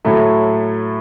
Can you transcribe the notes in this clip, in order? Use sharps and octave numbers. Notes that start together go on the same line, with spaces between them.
A2 F#3 A3 E4